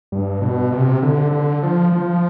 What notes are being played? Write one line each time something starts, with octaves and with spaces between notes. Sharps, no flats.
G2
B2
C3
D3
D3
F3
F3